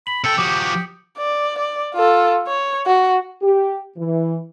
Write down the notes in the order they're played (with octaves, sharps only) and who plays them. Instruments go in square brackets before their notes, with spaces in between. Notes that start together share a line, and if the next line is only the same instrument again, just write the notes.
[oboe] B5 [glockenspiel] F#7
[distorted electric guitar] C3 G5 [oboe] A4 [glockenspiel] C#7
[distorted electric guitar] F3 F#4 [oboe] G4 [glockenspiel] D6 D#6
[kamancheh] D5
D5
F4 A4
C#5
F#4
[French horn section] G4
E3